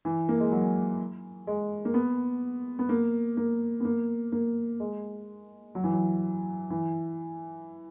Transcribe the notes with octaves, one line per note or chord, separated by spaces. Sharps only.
E3
A#3
G#3
F#3
G#3
A#3
B3
B3
A#3
A#3
B3
A#3
A#3
G#3
F#3
E3
F#3
E3